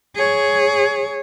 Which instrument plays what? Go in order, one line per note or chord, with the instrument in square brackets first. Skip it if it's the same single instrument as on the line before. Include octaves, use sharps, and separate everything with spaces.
[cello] G#4 C#5